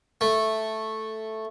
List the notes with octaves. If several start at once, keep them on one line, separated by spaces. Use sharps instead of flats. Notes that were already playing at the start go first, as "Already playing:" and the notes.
A3